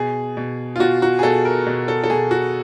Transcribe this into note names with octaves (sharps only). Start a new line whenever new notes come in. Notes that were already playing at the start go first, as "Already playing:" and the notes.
Already playing: B2 G#4
B2
F4
B2 F#4
F#4
G#4
B2 A4
A#4
B2
A4
A4
B2 G#4
F#4